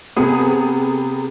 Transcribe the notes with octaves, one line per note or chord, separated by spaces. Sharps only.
C3 B3 G#4 A4 D#6